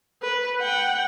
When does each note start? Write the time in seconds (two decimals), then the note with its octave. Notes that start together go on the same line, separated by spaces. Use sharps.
0.22 B4
0.59 F#5 G5